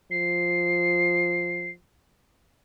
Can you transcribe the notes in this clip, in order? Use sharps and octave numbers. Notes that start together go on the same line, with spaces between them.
F3 C7